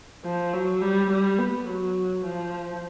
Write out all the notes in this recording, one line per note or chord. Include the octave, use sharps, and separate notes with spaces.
F3
F#3
G3
G3
B3
F#3
F3